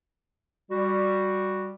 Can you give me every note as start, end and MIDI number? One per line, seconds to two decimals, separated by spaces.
0.71 1.71 55
0.71 1.71 66